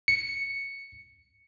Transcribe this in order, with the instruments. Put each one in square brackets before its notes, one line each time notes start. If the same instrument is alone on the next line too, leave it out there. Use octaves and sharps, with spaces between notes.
[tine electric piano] C#7